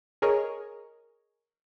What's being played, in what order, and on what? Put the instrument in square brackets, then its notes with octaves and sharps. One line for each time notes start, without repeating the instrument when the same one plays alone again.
[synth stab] G#4 A#4 C#5 D#5